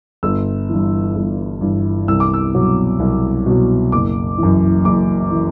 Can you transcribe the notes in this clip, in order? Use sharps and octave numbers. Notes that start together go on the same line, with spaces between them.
G1 E6
G2 E3
G1
G2 E3
C2 E6
D6
E6
B2 F#3
C2
B2 F#3
F#1 D6
F#2 E3
F#1 D6
E3